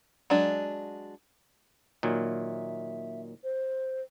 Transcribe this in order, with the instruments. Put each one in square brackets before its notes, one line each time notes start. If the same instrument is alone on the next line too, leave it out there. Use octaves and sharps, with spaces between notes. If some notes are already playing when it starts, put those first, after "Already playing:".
[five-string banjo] F#3 G#3 D4
[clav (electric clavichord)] A#2 D#3 F#3 [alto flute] E5
[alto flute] C5